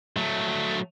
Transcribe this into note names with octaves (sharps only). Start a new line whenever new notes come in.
F#3 A3